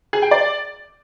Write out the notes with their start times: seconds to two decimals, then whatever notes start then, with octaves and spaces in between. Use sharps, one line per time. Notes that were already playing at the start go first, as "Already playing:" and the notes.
0.13 G#4
0.22 G5
0.31 D5